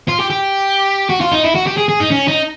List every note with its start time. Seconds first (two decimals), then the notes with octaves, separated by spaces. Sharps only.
0.08 F4
0.19 G4
0.30 G4
1.09 F#4
1.21 F4
1.32 D#4
1.43 E4
1.55 F#4
1.66 G4
1.77 G#4
1.88 G#4
2.00 D#4
2.11 C#4
2.28 D#4